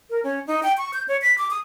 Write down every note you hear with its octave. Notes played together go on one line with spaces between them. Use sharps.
A#4
C#4
D#4
G5
C#6
G6
C#5
B6
D6
D#6